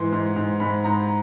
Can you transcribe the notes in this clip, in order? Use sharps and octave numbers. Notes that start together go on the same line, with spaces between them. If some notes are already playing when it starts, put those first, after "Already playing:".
Already playing: G#2 E3 C6
G#2
G#2
G#2 B5
G#2 A#5